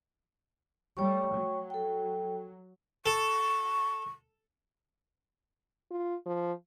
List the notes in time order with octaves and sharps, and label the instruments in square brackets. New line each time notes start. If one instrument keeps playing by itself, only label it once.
[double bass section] G3 A3 [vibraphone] C#5 G5 C#6
[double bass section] F#3
[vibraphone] A4 G5
[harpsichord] A4 [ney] C#6
[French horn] F4
F3